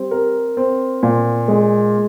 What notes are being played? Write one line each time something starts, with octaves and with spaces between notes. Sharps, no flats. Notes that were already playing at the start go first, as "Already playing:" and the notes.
Already playing: G3 C4
A#4
C4
A#2
G#3